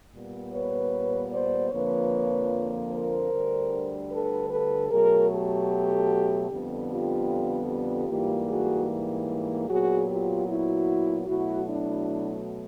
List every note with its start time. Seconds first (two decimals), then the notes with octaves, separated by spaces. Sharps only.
0.12 A#2 G3 B3
0.51 B4 C#5
1.31 C5 D5
1.71 F2 D3 F3 A#3 B4 C#5
2.91 A#4 C5
3.30 D2 D3 G3
4.10 A4 B4
4.49 A4 B4
4.90 B2 F#3 A3 G#4 A#4
5.29 G4 A4
6.49 F2 D3 G3 B3
6.89 F4 G4
7.68 F4 G4
8.08 G#2 E3 G3 A#3
8.48 F#4 G#4
9.67 A#2 F#3 B3 F#4 G#4
10.07 F4 G4
10.47 E4 F#4
11.26 B2 F#3 A3 E4 F#4
11.66 D4 E4